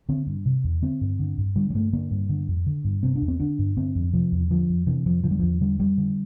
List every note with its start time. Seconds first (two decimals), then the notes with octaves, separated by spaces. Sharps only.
0.09 D3 C4
0.27 G2
0.46 C3
0.64 E2
0.82 D3 C4
1.01 G2
1.19 D3
1.38 G2
1.56 D3 G3
1.70 G3
1.74 G2 A3
1.93 D3 A#3
2.11 G2
2.29 D3
2.48 F2
2.66 D3
2.84 G2
3.03 C3 C4
3.16 D4
3.22 E2
3.28 C4
3.40 D3 D4
3.59 G2
3.77 D3 C4
3.95 F2
4.14 C3 F3
4.32 E2
4.50 D3 F3
4.69 F2
4.87 C3 E3
5.05 F2 F3
5.24 D3 F3
5.31 G3
5.39 E2 F3
5.61 D3 G3
5.79 F2 G3
5.98 D3